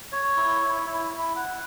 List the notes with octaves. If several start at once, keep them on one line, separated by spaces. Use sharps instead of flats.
C#5
E4
E4
E4
E4
F#5